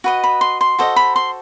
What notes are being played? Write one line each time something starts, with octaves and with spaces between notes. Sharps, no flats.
F#4 B4 D#5
B5
C6
C6
F#4 A4 C5 D#5
B5
C6